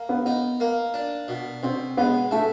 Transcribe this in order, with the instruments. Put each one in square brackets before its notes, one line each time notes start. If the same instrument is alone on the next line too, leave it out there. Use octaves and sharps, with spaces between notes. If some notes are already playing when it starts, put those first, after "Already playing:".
Already playing: [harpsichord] A#3
[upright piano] B3
[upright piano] B3 [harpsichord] D#4
[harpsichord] A#3
D4
B2
[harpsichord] B2 [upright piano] C4
[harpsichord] G#3 [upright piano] B3
[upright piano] A3 [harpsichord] E4